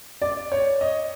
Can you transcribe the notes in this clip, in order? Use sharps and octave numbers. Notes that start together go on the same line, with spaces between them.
D5
C#5
D#5